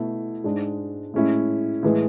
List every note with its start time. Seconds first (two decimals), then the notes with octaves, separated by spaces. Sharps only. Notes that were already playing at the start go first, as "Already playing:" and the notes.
Already playing: B2 A3 E4
0.44 G#2 G#3 D4
1.14 A2 G#3 C#4 E4
1.83 A2 E3 G#3